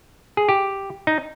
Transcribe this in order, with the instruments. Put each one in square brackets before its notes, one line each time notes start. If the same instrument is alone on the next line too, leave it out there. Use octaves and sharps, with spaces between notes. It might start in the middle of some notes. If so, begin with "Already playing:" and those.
[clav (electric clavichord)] G#4
G4
D#4